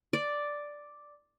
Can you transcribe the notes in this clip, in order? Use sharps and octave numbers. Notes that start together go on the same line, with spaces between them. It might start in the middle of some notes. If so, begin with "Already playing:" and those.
D5